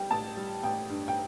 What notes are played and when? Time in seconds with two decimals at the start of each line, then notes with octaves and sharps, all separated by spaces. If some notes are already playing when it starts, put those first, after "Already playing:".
Already playing: G3 G5
0.10 A1 A5
0.37 G3
0.63 A1 G5
0.89 G2
1.08 G5